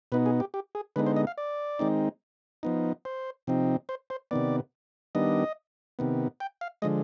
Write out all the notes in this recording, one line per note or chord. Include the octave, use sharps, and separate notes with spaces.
B2 B3 D#4 B4
G#4
G4
G4
G#4
D3 G#3 B3 D#4 B4
C5
D#5
F5
D5
D#3 G#3 C4 D#4
F3 B3 D#4
C5
C3 F3 C4 D#4
C5
C5
C3 D#3 B3 D5
D#3 G3 B3 D4 D#5
C3 D#3 B3
G5
F5
D3 F3 G#3 D#5